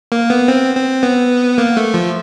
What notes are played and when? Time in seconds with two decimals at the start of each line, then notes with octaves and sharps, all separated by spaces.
0.12 A#3
0.30 B3
0.48 C4
0.75 C4
1.03 B3
1.58 A#3
1.77 A3
1.94 F3